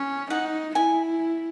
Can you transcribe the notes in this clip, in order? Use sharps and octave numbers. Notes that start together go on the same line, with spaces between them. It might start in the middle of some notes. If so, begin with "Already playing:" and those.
Already playing: C#4
D#4 F#5
E4 G#5